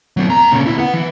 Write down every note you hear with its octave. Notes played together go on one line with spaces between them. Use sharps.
F#3 C4
E2 A#5
A#2 C#3
D2 E4
B3 F#5
E3